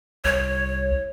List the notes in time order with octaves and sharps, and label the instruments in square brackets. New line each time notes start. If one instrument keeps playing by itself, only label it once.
[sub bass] C2 [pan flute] C#5